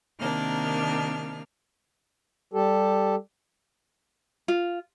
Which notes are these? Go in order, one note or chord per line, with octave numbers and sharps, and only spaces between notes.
C3 D#3 A#3 D4 F6
G3 G4 A4
F4